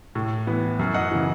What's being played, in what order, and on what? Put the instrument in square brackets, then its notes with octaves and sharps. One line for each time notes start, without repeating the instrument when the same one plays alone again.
[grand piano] A2
E3 B3
F#2
D#5 F#5
C#3 E3